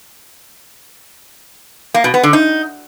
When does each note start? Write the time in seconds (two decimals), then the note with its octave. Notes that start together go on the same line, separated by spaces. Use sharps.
1.94 A#3
2.04 B2
2.14 B3
2.23 D3
2.33 D#4